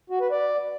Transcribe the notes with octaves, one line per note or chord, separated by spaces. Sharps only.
F#4
B4
D5